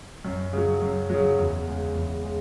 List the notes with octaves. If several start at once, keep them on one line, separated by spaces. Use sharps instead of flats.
F#2
C#3 F#3
F#2
C#3 F#3
E2
C#3 G#3
E2
C#3 G#3